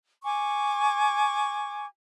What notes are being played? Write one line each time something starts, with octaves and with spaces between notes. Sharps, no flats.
G#5 C#6 D6